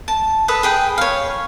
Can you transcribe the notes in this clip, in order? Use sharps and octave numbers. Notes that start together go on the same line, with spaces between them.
A5
A4 B4 B5 D#6
G#4 B4 G5
C#5 F5